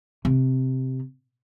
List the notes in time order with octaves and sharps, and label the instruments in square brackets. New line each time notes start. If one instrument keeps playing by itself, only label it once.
[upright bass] C3